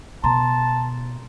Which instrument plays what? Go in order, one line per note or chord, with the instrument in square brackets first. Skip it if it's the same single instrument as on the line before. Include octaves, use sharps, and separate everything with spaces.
[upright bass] B2 [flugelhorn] A5 [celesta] A#5 C6